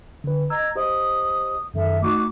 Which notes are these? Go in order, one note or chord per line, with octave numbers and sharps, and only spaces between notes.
D3 B4
D#5 A#5 E6 G#6
G4 C5 D#5 D#6
F#2 D#3 A4 E5
A3 D#4 F#4 C#6 D6 F#6